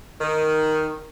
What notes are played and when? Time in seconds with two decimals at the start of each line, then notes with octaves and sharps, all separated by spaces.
0.21 D#3